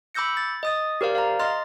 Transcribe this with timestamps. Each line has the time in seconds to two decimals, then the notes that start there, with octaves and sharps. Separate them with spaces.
0.15 B5 D6 E6 G6 A#6 C#7
0.37 A6
0.63 D#5 D#6 A6
1.01 G4 A#4 C5 D5 F5
1.15 F5 A#5
1.40 D#5 C6 F6 A6